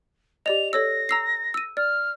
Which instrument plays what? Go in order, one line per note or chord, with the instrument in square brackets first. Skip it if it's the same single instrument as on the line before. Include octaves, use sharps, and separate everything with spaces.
[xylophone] G4 D5 D#5 [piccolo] F7
[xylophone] A4 C#5 E6 [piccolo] A#6
[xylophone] A#5 E6 C7
E6 D#7
[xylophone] D5 [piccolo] F6